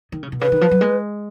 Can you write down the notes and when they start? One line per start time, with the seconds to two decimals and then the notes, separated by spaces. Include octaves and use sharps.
0.12 D#3
0.23 C#3
0.32 B2
0.41 C#3 B4
0.52 D#3
0.61 F3
0.71 F#3
0.81 G#3